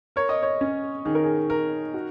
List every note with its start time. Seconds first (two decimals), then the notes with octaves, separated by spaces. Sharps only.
0.16 A#4 C#5
0.29 D#5
0.43 C#5
0.61 C#4
1.05 D#3 G#4
1.15 A#4
1.24 G#4
1.50 A#4
1.94 F#4